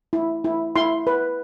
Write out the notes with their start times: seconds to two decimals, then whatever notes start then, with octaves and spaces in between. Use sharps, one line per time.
0.13 E4
0.44 E4
0.76 E4 C6
1.07 B4